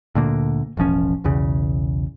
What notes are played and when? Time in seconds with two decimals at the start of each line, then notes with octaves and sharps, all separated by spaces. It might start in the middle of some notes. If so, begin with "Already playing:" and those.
0.15 D2 A#2 D3 A#3
0.77 E1 A1 F3 C#4
1.24 B1 E2 C#3